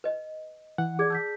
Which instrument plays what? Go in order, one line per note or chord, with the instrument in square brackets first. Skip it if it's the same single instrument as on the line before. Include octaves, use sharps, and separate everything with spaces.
[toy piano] B4 D#5
[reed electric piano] E3 F#5
[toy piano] G#4 D5 [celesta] D6 G#6
[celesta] A5 G6 B6 [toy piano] E6